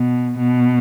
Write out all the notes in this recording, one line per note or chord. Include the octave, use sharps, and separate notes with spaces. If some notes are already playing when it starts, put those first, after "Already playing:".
Already playing: B2
B2